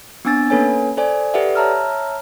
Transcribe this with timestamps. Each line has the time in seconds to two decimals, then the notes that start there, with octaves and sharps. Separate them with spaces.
0.25 B3 C4 D4 G#5 E6 A6
0.50 A#3 C#4 A4 B4 C#5 G#5
0.97 A4 C5 D5 G#5
1.34 G4 A4 B4 D5 E5 F#5
1.55 C#5 E5 A5 A#5 E6 F6